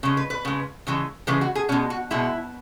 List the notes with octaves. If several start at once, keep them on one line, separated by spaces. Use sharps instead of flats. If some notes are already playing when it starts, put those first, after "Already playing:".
C#3 G#3
B4
B4
C#3 G#3
C#3 E3 G#3
C#3 E3 G#3 B4
F#4
G#4
B2 G#3 C#4
F#4
B2 G#3 E4